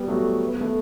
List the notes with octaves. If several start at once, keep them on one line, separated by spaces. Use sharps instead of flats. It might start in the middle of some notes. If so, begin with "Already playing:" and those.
Already playing: G3 B3
F#3 A3
B3
A3